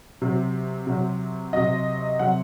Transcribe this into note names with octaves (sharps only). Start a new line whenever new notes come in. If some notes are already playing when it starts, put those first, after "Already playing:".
C3 F#3
C3 F#3
C3 F#3 D#5
C3 F#3 F#5